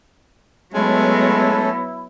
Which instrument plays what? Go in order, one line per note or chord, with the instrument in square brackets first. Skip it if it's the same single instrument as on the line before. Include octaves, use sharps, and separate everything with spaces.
[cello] F#3 B3 [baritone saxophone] G#3 [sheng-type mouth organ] A3 C#4 A4 [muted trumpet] E4